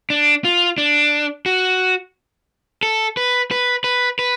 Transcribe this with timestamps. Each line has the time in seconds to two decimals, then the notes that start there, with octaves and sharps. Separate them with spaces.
0.10 D4
0.44 F4
0.78 D4
1.46 F#4
2.83 A4
3.17 B4
3.51 B4
3.84 B4
4.19 B4